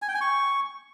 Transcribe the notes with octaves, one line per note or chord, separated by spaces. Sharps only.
G#5
G5
G#5
C#6